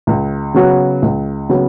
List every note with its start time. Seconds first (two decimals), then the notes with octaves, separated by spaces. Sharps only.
0.07 C#2
0.54 C#3 F#3 B3 F#4
1.02 C#2
1.49 C#3 F#3 B3 F#4